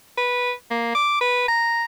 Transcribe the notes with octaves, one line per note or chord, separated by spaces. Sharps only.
B4
A#3
D6
B4
A#5